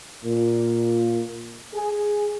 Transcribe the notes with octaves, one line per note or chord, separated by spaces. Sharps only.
A#2
G#4